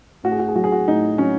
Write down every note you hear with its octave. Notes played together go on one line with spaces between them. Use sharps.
A2 F#4
G#4
F#4
G#4
F#3 F#4
G#4
F#4
A2 D#4
F#3 C#4